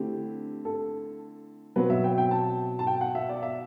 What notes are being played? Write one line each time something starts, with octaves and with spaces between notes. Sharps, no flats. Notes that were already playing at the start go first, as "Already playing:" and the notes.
Already playing: D3 A3 C4 E4 G4
A4
B2 F#3 C4 B4
E5
G5
G5
A5
A5
G5
F#5
E5
D5
E5